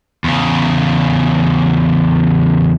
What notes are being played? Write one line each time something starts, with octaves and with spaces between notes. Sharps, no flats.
E2 C#3